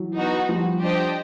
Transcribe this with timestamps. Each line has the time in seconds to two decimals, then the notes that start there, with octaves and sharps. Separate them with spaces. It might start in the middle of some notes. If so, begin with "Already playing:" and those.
Already playing: E3 F#3
0.16 B3 D#4 F#4
0.49 F3 G3
0.82 D4 G4 C5 D#5 G5